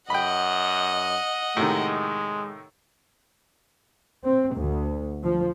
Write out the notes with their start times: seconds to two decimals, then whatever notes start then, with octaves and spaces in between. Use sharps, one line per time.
0.10 F#2 D#5 F#5 G5 B5
1.57 A2 C3 D#3 G#3
4.24 C4
4.56 D2
5.23 F3